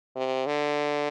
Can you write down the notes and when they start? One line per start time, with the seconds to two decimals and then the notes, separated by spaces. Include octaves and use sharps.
0.16 C3
0.46 D3